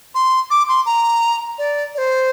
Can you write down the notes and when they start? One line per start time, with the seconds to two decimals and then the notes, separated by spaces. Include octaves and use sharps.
0.15 C6
0.51 D6
0.69 C6
0.86 A#5
1.58 D5
1.95 D5
1.98 C5